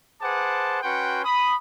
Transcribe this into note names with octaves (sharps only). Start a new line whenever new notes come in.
G#4 B4 C5 F#5 A5 D6
C#4 F#4 B4 F#5 G5 C6
B5 D#6